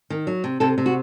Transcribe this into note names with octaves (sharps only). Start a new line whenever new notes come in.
D#3
F#3
C3
C3 A4
C3
F#4